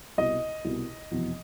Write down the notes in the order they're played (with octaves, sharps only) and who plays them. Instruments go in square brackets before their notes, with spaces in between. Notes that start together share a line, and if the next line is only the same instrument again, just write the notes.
[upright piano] C2 B2 D#5
C2 B2
F1 E2 B2